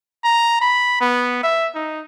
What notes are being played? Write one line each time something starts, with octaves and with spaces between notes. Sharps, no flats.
A#5
B5
B3
E5
D#4